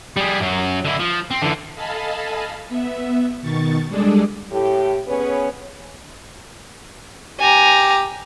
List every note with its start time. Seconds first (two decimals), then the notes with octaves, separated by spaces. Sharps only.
0.17 G3 G#4
0.40 F#2 F#3
0.85 D3 E4
1.00 F3
1.31 C4
1.42 D3 E3
1.75 A4 D#5 F5 G#5 A5 B5
2.69 B3 E5
3.42 B2 D#3 C#6 A6
3.89 G3 G#3 D4 G#4 A4 D5
4.51 A2 G4
5.06 B3 C#4 G#4 B4 C#5
7.40 G4 G#5 A#5